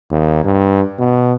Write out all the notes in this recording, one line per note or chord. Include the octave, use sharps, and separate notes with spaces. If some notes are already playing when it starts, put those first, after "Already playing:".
D#2
G2
B2